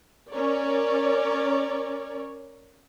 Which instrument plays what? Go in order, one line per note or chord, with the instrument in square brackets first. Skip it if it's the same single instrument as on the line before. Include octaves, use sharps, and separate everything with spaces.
[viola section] C#4 A#4 C#5 D5